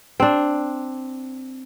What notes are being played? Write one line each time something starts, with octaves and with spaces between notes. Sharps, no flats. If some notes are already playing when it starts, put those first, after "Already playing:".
C4 D4